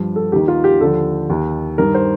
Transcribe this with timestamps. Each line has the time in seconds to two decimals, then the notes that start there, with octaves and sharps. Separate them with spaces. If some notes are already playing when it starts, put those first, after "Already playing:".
Already playing: G2 F3
0.16 A4
0.32 D#2 D#3 G4
0.48 F4
0.64 G4
0.80 D#2 D3 F3 A4
1.30 D#2 D#3
1.78 G2 D#3 A#4
1.94 C5